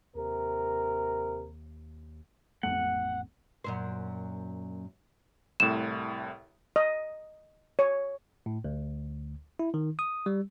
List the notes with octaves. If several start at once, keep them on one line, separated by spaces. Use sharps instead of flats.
D#2 C3 A#4
A1 F2 A3 F#5
F#2 A#2 C5
C2 A2 E7
D#5
C#5
A2
D2
E4
D#3
D#6
G3